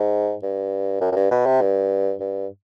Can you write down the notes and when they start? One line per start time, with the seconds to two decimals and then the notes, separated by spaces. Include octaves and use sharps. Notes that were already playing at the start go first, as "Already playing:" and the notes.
Already playing: G#2
0.42 G2
1.01 F#2
1.12 F#2
1.16 G2
1.31 B2
1.46 C3
1.61 G2
2.20 G2